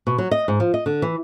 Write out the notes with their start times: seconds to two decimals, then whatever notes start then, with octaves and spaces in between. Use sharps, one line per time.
0.07 B2
0.18 F#3
0.31 D#5
0.48 G#2
0.60 F3
0.74 D#5
0.86 D3
1.02 E3